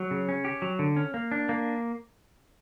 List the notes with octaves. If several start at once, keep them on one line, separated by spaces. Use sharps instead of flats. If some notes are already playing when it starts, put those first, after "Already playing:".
Already playing: F#3
C#3
C#4
G4
F#3
D3
C#4
A#3
D4
A#3